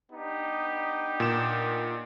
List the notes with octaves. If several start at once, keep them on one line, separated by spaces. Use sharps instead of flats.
B3 D4 D#4 G4
A#2 D6 E7